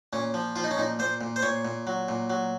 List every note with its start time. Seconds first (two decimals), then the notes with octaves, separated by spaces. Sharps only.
0.13 A#2 C#4
0.34 F3
0.56 F3 F4
0.64 D#4
0.71 C#4
0.78 A#2 D#4
0.99 A#2 C5
1.21 A#2
1.36 C5
1.43 A#2 C#5
1.65 A#2
1.87 F#3
2.09 A#2
2.30 F#3